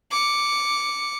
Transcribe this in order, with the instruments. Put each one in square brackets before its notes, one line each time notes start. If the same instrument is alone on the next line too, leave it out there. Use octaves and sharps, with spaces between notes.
[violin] D6 C#7